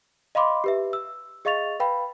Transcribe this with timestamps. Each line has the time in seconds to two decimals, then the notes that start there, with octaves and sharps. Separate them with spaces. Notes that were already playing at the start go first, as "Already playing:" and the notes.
0.35 D#5 F5 B5 C6 D6
0.64 G4 B4 E5
0.93 E6
1.45 G#4 D#5 F5 C#6 A6 F7
1.80 B4 F5 G5 B5